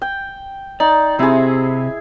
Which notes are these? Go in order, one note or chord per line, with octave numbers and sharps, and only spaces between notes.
G5
D#4 D5
C3 C4 E4 G#4